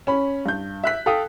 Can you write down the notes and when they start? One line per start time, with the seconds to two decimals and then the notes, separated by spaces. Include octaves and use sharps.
0.07 C#4 B5
0.46 G2 G6
0.83 E5 F#6 B6
1.06 A4 F5 G5 D#6